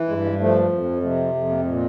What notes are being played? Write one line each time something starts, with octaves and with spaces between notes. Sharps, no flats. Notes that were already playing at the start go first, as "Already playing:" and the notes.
Already playing: E3
G2 G#3
G#3
F3 A3
F2
C3 A3
F2
A#3
A#2 A3